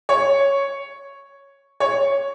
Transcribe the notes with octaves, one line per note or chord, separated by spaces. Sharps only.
C#5
C#5